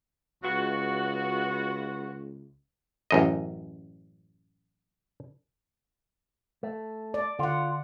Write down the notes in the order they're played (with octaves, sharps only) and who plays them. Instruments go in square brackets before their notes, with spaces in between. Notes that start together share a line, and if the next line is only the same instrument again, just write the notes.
[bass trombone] C#2 [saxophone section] B3 F4 F#4
[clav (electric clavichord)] A1 F#2 D#5
[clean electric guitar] A3
[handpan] D5
[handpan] D3 F#5 [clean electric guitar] F4